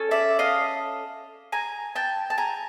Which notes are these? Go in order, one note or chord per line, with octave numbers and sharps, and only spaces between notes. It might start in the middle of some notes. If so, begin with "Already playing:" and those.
Already playing: C#4 A4
D5 E5
D#5 F5
G#5 A#5
G5 A5
A5
G#5 A#5